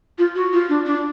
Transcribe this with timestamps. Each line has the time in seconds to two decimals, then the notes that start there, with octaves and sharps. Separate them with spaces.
0.18 F4
0.35 F#4
0.53 F4
0.69 D4
0.86 D4